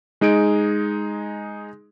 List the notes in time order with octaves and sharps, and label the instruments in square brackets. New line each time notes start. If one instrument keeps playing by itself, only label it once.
[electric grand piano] G#3 D#4 G#4 D7